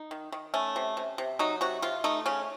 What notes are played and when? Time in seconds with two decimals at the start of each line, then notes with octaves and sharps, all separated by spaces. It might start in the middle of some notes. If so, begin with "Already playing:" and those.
Already playing: D#4
0.11 D#3
0.32 D#3
0.54 A3 C#4
0.76 C3
0.97 C3
1.18 C3
1.39 F#3 D#4
1.61 C3 F#4
1.82 C3 F4
2.04 A3 D#4
2.26 C#3 C#4